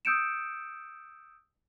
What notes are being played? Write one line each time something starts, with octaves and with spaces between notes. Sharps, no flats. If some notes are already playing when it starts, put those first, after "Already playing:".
D#6 E6 G6 C#7 D7 E7